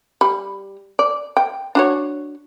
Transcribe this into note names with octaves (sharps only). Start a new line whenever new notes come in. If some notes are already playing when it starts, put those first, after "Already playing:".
G3 B5
D5
G5
D4 F#4 C#5